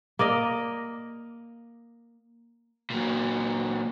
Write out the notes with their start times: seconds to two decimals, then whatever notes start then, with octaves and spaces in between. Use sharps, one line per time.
0.19 A#3 D5 D#5
2.90 A#2 F#3